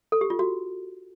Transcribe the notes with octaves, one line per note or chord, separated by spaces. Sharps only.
A4
G4
F4
F#4